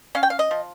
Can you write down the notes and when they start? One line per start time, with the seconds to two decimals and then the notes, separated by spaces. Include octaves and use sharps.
0.15 C#4 F5
0.23 G5
0.30 F5
0.39 D#5
0.51 F3